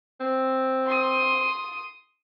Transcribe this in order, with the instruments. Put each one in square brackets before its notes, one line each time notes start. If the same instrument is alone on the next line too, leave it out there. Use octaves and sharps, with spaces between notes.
[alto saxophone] C4
[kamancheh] C6 D#6